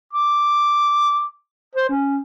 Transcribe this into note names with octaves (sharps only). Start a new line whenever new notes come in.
D6
C5
C#4